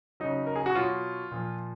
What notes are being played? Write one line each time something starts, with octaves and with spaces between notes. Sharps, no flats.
C#3 F#3 D#4
A#4
G#4
F#4
B2 F#3 F4
A#2 F3